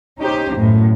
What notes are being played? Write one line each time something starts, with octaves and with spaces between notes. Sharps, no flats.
C#4 D#4 G4 C5
B1 F#2 A2